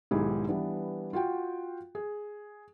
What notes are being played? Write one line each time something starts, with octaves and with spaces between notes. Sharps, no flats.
B1 G#2 D#3 E4 G4 G#4
E3 G3 B3 D4
F4 F#4 F#5 G5
G#4